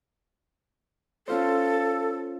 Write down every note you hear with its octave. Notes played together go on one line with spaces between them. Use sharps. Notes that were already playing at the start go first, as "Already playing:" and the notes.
C#4 F4 A4 C5